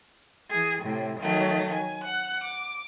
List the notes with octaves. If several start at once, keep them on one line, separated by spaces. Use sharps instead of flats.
E3 G#4
A2 C3
D#3 F#3 A3
G#5
F#5 F#6
D6